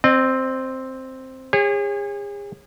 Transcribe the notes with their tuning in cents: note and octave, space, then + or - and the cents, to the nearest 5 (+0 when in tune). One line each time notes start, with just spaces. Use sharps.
C4 +0 D#5 -45
G#4 -40 C#5 -25